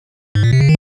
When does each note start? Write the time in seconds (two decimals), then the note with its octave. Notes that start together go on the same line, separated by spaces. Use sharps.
0.35 G#2
0.44 A#2
0.53 C3
0.61 C#3
0.69 D#3